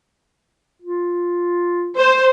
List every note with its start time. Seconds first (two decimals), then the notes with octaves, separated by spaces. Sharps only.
0.82 F4
1.97 C5